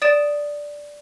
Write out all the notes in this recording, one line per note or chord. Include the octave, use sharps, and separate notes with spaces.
D5 D#6 A6 D7 E7